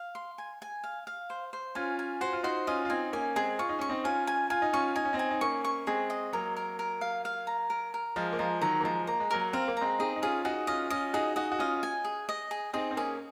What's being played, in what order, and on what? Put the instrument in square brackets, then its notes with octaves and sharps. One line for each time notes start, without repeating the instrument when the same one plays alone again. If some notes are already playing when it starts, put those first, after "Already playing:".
Already playing: [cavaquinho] F5
C6
G#5
G#5
F5
F5
C5
C5
[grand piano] C#4 F4 [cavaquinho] G#5
[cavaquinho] G#5
[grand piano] F#4 [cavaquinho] C5
[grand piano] F4
[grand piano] D#4 F#4 [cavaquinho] C5
[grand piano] C#4 F4 [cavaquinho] D#5
[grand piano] F4
[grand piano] C4 D#4 [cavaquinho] G#5
[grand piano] A#3 C#4 [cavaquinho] G#5
[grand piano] G#3 C4 [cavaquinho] G#4
[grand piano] F4 [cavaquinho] C#6
[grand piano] D#4
[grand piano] C#4 [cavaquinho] C#6
[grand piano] C4 D#4
[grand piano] C#4 F4 [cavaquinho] G#5
[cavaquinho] G#5
[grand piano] F4 [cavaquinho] G#5
[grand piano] D#4
[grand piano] C#4 F4 [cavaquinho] C#6
[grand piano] D#4 [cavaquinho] G#5
[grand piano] C#4
C4 D#4
[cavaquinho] G#5
[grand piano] D#4
[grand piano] A#3 C#4 [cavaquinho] C#6
[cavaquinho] C#6
[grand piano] G#3 C4 [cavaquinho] G#4
[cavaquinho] D#5
[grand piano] F#3 A#3 [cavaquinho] A#4
[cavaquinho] A#4
A#4
F5
F5
A#5
A#4
A#4
[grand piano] F3 G#3 [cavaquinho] F5
[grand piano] A#3
[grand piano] F3 G#3 [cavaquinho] A#5
[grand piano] D#3 F#3 [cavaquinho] A#5
[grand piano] A#3
[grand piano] F3 G#3 [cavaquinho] A#5
[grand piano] A#3 [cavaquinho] A#5
[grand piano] G#3
[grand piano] F#3 A#3 [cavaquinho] A#4
[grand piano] C4 [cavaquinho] F5
[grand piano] A#3
[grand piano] G#3 C4 [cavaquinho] A#5
[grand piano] C4 D#4 [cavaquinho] G#4
[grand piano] D#4
[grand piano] C#4 F4 [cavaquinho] G#4
[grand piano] D#4 F#4 [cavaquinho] G#4
[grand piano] C#4 F4 [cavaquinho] D#5
[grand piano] C#4 F4 [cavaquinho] D#5
[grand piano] D#4 F#4 [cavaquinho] G#4
[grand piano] D#4 F#4 [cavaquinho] D#5
[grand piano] F#4
[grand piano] C#4 F4 [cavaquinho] D#5
[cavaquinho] G#5
G#4
D#5
G#4
[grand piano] C4 D#4 [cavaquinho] G#4
[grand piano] C4
[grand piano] A#3 C#4 [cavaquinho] G#4